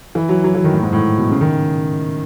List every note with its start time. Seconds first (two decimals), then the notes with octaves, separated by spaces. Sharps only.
0.15 E3
0.29 F#3
0.44 F#3
0.55 E3
0.64 D#3
0.73 A2
0.83 G#2
0.93 A2
1.17 B2
1.31 C#3
1.41 D#3